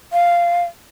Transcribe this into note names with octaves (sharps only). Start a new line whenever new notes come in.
F5